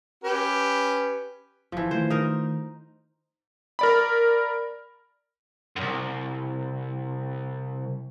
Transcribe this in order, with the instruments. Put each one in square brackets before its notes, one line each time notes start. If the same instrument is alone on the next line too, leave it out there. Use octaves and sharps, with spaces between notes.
[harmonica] C#4 G4 B4
[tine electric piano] G1 [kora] E3 F3
[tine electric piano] D#3 A3 [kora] C5
[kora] D#4 A#4
[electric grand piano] A#4 D5 B5
[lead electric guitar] C2 F#2